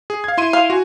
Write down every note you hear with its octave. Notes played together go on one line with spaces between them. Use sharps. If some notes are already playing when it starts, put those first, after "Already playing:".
G#4
F5 G#6
E4 C6 D#7
F5
F#4 G#5